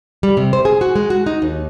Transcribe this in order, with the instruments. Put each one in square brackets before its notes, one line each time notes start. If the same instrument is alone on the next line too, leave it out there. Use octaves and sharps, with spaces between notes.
[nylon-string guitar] G3
C3
C5
G#4
F#4
G#3
F#4
D#4
D#2